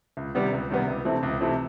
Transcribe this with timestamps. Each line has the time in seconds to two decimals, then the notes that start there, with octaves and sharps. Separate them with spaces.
0.17 C#2
0.35 C3 D#3 G3 B3
0.53 C#2
0.70 C3 D#3 G3 B3
0.88 C#2
1.05 C3 E3 A3 C4
1.23 C#2
1.40 C3 E3 A3 C4